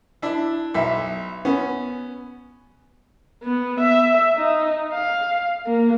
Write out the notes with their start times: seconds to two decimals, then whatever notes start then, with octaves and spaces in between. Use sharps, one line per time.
0.22 D4 E4
0.74 B1 E5
1.45 B3 C#4
3.43 B3
3.80 E5
4.37 D#4
4.93 F5
5.67 A#3